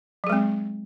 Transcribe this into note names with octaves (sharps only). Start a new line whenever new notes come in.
F#3 G#3 C4 G#4